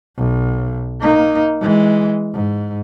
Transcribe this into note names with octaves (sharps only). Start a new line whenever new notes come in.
B1
A#3 D#4
E3 G#3
G#2